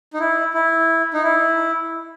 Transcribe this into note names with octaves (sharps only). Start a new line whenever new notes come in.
D#4
E4
E4
D#4
E4